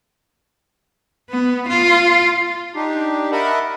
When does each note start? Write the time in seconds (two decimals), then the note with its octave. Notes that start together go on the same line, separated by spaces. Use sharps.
1.30 B3
1.68 F4
2.75 D4 D#4 G4
3.32 A#4 D#5 E5 F#5 A5 B5